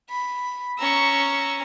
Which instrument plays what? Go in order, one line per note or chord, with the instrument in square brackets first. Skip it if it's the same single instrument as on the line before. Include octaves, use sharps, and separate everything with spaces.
[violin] B5
[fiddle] C#4 A#5 [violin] C#6 E6